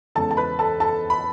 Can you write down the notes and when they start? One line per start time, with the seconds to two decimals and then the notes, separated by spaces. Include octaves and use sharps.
0.15 E2 C#3 G#3 A4 A5
0.31 A5
0.37 B4 B5
0.59 A4 A5
0.80 A4 A5
1.10 B5